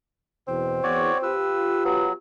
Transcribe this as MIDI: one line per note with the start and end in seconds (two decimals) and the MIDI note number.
0.48 0.83 40
0.48 0.83 47
0.48 1.32 60
0.83 1.10 40
0.83 1.18 66
0.83 1.18 73
0.83 1.18 74
1.23 2.15 65
1.23 2.15 67
1.23 1.84 71
1.23 1.84 88
1.85 2.12 54
1.85 2.09 59